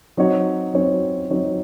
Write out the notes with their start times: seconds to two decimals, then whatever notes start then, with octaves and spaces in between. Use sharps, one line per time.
0.17 F#3 C4 D#4 F#4 C#5
0.74 F#3 C4 D#4 F#4 C#5
1.30 F#3 C4 D#4 F#4 C#5